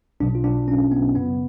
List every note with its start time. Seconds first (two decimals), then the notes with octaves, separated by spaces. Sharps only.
0.20 B1 B2 F#3 D4
0.35 F4
0.44 D4
0.68 C#4
0.92 B3
1.15 F#2 C#3 F#3 B3